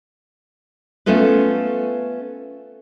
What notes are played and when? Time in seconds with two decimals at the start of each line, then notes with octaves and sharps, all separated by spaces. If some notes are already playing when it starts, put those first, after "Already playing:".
1.06 A3 B3 C#4 F4 A4 B4